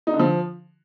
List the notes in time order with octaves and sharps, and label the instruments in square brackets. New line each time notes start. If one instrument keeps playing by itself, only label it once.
[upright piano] D#4
D3
F3